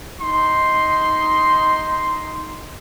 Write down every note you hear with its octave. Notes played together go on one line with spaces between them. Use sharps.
D#4 C6